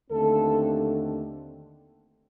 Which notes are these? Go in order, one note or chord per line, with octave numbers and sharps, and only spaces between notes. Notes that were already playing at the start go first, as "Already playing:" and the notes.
D#2 D3 A3 C4 A4